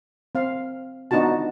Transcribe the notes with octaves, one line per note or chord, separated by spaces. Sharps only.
C4 F5
B3 D4 D#4 F4 F#4 A5